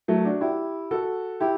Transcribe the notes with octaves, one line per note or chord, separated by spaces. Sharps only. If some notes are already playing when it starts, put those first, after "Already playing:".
F#3 A3
D4 F#4
E4 G4
F#4 A4
E4 G4